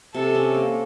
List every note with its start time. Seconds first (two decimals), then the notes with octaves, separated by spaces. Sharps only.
0.14 C3 A4
0.35 C#4
0.54 A#3